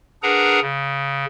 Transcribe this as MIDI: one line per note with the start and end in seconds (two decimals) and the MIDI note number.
0.23 0.60 62
0.23 0.60 68
0.23 0.60 70
0.23 0.60 71
0.23 0.60 78
0.23 0.60 82
0.61 1.25 49